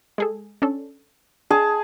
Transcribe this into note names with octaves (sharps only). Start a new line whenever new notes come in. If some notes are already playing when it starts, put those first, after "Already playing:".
G#3 G#4 A4
C#4 D4 A4
D4 G#4 A5